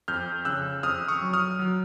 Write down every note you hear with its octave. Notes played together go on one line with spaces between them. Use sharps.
F2 F6 G6
C#3 E6 F#6
F2 D#6 F6
C#6 D#6
F#3
D#6 F6
F#3